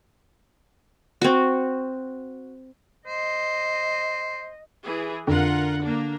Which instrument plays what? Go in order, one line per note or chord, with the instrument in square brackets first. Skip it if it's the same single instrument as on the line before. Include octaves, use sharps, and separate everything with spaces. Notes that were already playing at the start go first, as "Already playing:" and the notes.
[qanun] C4 F#4
[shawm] C5 [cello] D#5
[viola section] E3 G#4
[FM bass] F2 [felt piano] D3 [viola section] F4 A#4 F#5
[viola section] A#3 D4